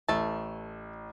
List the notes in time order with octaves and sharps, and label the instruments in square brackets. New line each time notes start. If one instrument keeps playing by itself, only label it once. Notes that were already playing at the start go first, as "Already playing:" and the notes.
[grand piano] A1 [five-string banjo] A3 A5